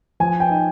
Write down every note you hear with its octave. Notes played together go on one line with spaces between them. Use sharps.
F3 G#5
G5
D#4